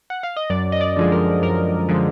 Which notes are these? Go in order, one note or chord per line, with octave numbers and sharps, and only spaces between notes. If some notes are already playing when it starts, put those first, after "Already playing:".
F#5
F5
D#5
F#2 D5
D#5
D5
D3 F3 G#3
A#4
F#2 A#4
D3 F3 G#3